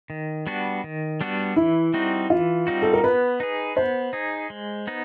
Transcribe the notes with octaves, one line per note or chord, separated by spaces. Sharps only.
D#3
G3 B3 D4 F#4
D#3
G3 B3 D4 F#4
E3 E4
G3 C4 D#4 F#4
E3 F4
G3 C4 D#4 F#4
A4
A#4
B3 B4
D#4 G#4
B3 C5
D#4 G#4
G#3
B3 D#4